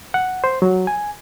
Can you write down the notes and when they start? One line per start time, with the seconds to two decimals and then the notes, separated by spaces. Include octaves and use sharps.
0.14 F#5
0.44 C5
0.62 F#3
0.87 G#5